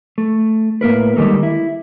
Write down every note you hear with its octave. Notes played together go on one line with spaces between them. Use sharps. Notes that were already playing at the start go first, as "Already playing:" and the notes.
A3
A2 A#3 A#4 B4
D#3 G3 G#3 A#3 A4 A#4
E4